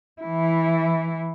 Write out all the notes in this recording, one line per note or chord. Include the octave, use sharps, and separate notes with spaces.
E3 E4